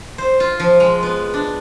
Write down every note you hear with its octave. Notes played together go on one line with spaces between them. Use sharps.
C5
F4
F3
G#3
B3
D4